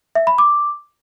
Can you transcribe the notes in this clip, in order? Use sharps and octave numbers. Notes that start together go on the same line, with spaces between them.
E5
B5
D6